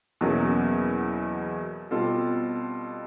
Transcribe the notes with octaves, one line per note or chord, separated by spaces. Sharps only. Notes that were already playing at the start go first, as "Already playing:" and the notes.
E2 B2 F#3 A#3 C#4
B2 G3 C4 F4 A4